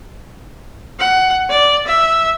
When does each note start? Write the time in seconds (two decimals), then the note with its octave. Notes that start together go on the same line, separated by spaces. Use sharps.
1.00 F#5
1.49 D5
1.87 E5